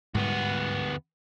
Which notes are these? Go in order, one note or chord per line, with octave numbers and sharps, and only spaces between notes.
D2 G#2 G3 B3